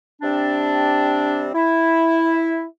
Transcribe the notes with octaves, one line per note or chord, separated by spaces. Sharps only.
C3 G3 C4 D4
E4